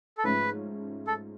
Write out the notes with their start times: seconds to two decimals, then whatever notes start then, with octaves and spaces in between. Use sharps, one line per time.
0.18 A4
0.24 G#2 F3 A3 C#4 F4 B4
1.07 A4